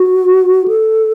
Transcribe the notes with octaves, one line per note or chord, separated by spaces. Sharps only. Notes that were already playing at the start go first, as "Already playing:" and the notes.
Already playing: F#4
A4